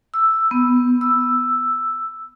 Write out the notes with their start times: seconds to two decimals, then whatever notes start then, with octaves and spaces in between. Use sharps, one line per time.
0.14 E6
0.51 B3
1.01 E6